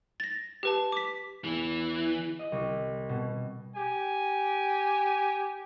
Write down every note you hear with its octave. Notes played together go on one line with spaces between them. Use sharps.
A6 A#6
G4 B4 A5
D6 B6
E2 E3
D#5
C2
B2
G4 G#5